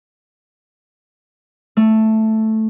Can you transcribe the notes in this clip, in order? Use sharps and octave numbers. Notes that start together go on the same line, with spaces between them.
A3